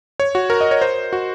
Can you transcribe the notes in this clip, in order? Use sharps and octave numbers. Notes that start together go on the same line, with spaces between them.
C#5
F#4
A#4
D#5
C#5
C5
F#4